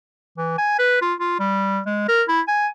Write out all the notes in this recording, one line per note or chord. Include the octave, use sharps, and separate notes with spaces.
E3
G#5
B4
F4
F4
G3
G#3
A#4
E4
G#5